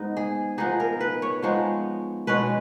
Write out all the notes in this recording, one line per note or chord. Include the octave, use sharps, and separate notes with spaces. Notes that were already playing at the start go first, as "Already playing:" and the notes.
Already playing: G#2 B3 D#4
G#4
F3 B3 D#4 G#4
A#4
B4
C#5
F3 G#3 B3 D#4 C#5
B2 G#3 C#4 B4